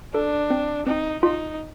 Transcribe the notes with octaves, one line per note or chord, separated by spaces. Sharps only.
D4 A4
C4
C4 D#4
D#4 F4